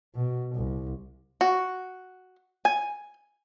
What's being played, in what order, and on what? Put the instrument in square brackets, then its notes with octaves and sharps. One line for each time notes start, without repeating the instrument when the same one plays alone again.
[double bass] B2
C2
[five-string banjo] F#4
G#5